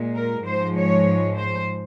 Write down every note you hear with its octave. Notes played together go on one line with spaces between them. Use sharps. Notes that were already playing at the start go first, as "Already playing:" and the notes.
Already playing: A#2 G#3
A#4
G#2 F3 G#3 C5
C#5
C5